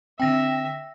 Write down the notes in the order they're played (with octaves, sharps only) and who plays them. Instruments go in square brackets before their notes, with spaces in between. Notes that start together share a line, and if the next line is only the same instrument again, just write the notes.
[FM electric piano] D3 C4 [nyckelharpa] E5 [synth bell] G5 A#6